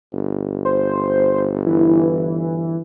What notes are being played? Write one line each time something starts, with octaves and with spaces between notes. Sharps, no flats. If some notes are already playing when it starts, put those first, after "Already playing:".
G1
C5
E3